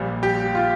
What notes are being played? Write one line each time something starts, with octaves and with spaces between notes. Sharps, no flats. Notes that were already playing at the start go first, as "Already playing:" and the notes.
Already playing: A#1 A#2 G3
G4
F4